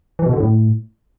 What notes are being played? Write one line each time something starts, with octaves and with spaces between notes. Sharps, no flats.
E3
B2
D3
A2